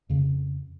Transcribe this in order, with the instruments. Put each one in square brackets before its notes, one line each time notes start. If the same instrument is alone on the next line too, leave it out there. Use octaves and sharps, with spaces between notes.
[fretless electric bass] F2 C#3